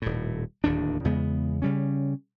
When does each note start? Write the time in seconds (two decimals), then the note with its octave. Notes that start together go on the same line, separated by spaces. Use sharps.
0.02 D#1 A2
0.64 D1 D#2 D#3 D4
1.05 E2 C#3 G#3 B3
1.62 C#3 G3 C#4